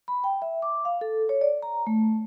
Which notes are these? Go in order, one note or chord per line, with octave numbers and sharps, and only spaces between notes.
B5
G5
E5
D6
F5
A4
C#5
D5
A#5
A3